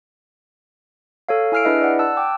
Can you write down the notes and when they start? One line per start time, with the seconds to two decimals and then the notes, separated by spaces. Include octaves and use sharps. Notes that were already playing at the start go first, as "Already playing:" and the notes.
1.29 A4 C#5 F5
1.52 E4 G#5 E6 F6 C7 D7
1.65 D4 E4 G#4 B4 D#5 E5
1.82 D5 F#5
1.99 A5 E6 F#6
2.17 G5 D6